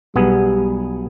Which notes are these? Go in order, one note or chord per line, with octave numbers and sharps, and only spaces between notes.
B1 G3 B3 G#4